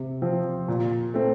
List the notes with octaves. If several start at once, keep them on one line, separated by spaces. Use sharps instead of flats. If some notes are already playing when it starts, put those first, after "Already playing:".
Already playing: C3
F3 C4
A#2
A3 C4